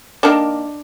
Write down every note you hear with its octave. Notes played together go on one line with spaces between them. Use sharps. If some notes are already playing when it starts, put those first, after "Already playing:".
D#3 A#3 D4